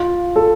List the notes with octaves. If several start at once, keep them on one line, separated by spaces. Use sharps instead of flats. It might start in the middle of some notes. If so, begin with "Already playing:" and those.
Already playing: F4
A4